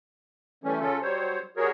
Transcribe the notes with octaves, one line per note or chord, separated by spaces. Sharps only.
E3 G3 A3 C#4
C#3 C#4 F4 A4
F#3 G3 C5 C#5
G3 F#4 G#4 A#4 C#5